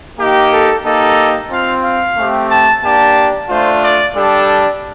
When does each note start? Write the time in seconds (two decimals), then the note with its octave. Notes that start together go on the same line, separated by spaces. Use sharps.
0.20 A#3 D#4 G4
0.53 A4
0.85 A#3 D#4 G4 A4
1.51 C4 F4 F5
1.84 F5
2.18 A3 C4 G4
2.50 A5
2.83 A#3 D4 G4 A5
3.49 A3 D4 F4 C5
3.83 D5
4.15 G3 D4 G4 A4